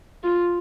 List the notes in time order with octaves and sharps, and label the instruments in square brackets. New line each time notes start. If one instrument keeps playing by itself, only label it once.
[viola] F4